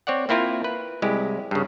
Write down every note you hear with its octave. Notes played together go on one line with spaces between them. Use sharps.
C4 C#5 D5 F#5
A#3 C4 E4 F4 A#4 C5
B4
C2 G#3 E4 G4
G2 C#3